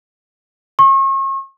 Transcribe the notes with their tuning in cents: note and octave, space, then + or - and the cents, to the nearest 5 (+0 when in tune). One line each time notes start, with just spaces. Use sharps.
C#6 -40